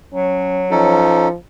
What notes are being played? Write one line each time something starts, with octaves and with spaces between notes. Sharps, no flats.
F#3 C#4
F3 C#4 D#4 A4